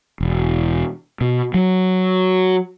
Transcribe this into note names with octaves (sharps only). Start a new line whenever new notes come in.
E1
B2
F#3